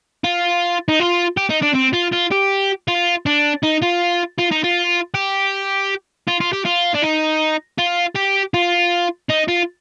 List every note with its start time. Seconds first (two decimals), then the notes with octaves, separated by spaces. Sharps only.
0.24 F4
0.88 D#4
1.00 F4
1.37 G4
1.50 D#4
1.62 D4
1.75 C4
1.94 F4
2.13 F4
2.31 G4
2.88 F4
3.26 D4
3.63 D#4
3.83 F4
4.39 F4
4.52 D#4
4.64 F4
5.14 G4
6.28 F4
6.40 F4
6.53 G4
6.65 F4
6.95 D4
7.03 D#4
7.79 F4
8.16 G4
8.54 F4
9.30 D#4
9.48 F4